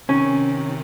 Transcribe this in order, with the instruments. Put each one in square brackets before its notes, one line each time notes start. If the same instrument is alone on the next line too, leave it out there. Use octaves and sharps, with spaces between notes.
[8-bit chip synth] C3 D#3 [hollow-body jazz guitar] C#4